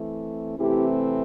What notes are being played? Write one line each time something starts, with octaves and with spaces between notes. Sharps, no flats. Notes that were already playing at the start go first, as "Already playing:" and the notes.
Already playing: E3 A3 C4
C3 E3 A3 C4 E4 G4